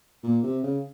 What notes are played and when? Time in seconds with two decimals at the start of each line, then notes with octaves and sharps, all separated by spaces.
0.23 A#2
0.43 C3
0.63 C#3